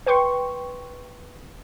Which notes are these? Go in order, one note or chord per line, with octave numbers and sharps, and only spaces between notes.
B4 G5 C6 C#6